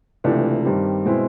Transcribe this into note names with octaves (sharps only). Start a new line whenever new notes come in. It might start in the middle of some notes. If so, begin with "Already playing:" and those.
C#2 C3 E3 A3 D4
G2 D#3 G3 C4
B2 G#3 C4 E4